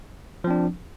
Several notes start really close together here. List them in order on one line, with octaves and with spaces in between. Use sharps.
F3 C4 D4